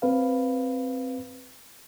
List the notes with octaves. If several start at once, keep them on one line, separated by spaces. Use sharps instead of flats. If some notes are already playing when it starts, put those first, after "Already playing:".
C4 B4 F5